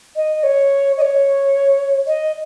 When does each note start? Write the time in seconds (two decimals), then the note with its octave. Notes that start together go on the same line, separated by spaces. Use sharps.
0.16 D#5
0.43 C#5
0.97 D#5
1.01 C#5
2.07 D#5